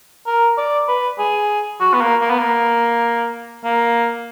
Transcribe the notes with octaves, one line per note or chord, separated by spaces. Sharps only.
A#4
D5
B4
G#4
F#4
B3
A#3
A#3
B3
A#3
A#3